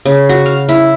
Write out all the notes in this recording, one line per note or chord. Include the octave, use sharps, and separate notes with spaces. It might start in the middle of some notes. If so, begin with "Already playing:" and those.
C#3
F#4
F5
E4